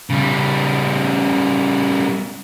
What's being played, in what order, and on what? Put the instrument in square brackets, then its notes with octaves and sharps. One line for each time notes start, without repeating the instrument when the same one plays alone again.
[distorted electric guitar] C#3 G3